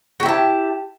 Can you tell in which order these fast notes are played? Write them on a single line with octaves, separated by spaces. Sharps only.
F#4 G4 E4 A5